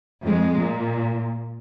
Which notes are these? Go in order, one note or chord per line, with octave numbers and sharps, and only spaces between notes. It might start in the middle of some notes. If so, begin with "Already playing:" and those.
F2 G#3
A#2